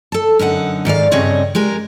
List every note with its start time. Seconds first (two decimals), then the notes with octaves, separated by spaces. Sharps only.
0.12 A4 A5
0.39 F#2 D3 D#4 F#5
0.85 G#2 D#3 D5 F5
1.11 G2 C#3 G3 C4 C#5 D#5
1.55 G#3 G4 A#4